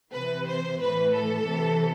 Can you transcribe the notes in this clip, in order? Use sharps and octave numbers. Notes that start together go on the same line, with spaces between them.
C3 E3 B4
C5
A2 E3 B4
A4
C3 E3